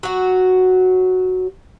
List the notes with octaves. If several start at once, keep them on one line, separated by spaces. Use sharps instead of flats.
F#3 F#4